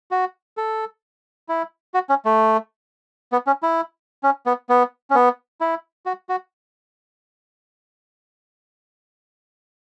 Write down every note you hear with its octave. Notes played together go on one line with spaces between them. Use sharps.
F#4
A4
E4
F#4
C#4
A3
B3
C#4
E4
C#4
B3
B3
C#4
B3
E4
F#4
F#4